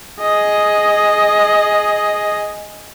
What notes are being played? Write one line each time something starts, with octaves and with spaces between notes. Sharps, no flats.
G#4 D#5